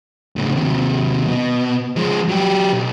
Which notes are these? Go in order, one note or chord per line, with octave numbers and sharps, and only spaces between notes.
C#2 A2
D#2 C3
B2
F3 G#3
F#3 G4
B1